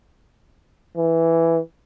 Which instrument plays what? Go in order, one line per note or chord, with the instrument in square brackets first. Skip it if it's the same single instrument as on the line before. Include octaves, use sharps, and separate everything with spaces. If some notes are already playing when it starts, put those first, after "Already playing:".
[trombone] E3